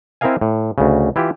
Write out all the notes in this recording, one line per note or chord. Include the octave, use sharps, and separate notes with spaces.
C4 E4 A#4 D#5 F5 G#5
A2
D2 C#3
E3 E4 F4 G4